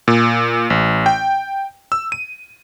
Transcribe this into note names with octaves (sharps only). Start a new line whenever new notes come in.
A#2
A1
G5
E6
D#7